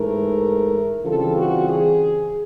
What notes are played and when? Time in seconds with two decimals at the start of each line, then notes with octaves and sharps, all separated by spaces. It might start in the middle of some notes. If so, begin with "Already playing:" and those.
Already playing: G#2 E3 A3 A#4
1.05 C#3 E3 G3 C4 F4 A4
1.35 F#4
1.68 G#4